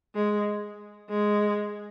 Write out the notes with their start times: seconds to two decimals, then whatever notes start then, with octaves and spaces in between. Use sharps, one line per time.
0.15 G#3
1.09 G#3